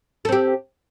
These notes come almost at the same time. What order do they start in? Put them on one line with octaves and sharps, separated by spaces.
A4 C4 G4